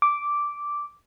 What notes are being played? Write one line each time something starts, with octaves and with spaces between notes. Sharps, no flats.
D6